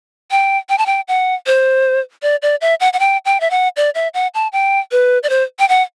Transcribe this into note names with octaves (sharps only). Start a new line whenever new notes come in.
G5
G5
A5
G5
F#5
C5
D5
D5
E5
F#5
F#5
G5
G5
E5
F#5
D5
E5
F#5
A5
G5
B4
D5
C5
G5
F#5